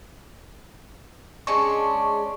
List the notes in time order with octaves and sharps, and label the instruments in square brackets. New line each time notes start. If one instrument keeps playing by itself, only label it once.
[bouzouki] G#3 C#4 D4 [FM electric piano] C#6